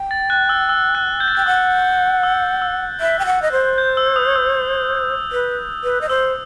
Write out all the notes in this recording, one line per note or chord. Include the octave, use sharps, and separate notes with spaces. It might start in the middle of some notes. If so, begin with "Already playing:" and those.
Already playing: G5
A6
F#6
E6
E6
F#6
G6
A6
G5 G6
F#5 E6
E6
E6
E5 F#6
G5
F#5
D#5
C5
G6
E6
D#6
E6
B4
B4
D#5
C5 E6